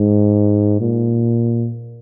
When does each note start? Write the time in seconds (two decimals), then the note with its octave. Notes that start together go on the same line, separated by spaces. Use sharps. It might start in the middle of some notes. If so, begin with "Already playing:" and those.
Already playing: G#2
0.81 A#2